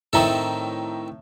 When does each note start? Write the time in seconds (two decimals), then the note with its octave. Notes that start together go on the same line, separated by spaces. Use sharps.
0.13 A2 D#3 C4 A4 E5 A#5